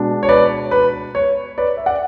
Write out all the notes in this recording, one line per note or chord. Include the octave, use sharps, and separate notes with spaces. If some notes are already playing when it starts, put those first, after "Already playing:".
Already playing: B2 G#3 D4
C#5
B4 D5
B4
C#5
B4 D5
E5
D5 F#5